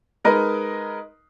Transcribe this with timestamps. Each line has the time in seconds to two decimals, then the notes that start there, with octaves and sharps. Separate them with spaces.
0.25 G#3 D#4 A#4 B4 D#5